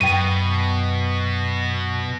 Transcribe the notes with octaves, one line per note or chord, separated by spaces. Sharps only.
F#2 B2 G5 D#7